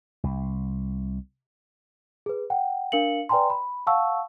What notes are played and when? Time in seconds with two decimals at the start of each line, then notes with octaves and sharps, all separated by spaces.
0.24 C2
2.26 G#4 B4
2.50 F#5 G5
2.92 D4 A#4 F5 C#7 F#7
3.29 B4 D5 G5 G#5 A#5 C6
3.50 B5
3.87 F5 F#5 A5 C#6 E6